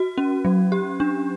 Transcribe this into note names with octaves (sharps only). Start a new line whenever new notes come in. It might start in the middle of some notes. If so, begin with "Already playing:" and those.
Already playing: F#4
C#4
F#3
G4
D4